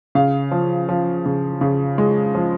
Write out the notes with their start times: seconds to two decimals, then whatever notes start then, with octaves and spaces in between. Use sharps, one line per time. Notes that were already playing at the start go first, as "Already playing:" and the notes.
0.15 C#3 F5
0.51 F3
0.89 F3
1.26 C#3
1.61 C#3
1.98 G#3
2.35 F3